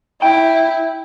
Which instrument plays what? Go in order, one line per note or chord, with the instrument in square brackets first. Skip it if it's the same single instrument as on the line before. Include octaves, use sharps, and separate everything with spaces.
[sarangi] E4 [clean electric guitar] G5